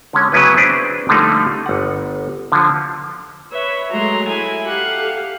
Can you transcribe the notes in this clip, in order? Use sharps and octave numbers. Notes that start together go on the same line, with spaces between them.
D3 G#3 C#4
C#3 F#3 B3 C#4 E4 B4
C4 D4 G#4 B4 C5 D5
D3 F3 G3 A3 A#3 D#4
G1 F#5
D3 F3
B4 C#5 E5
F#3 G#3 A3 A#5 C6
E4 G#5
G4 A4 F5 F#5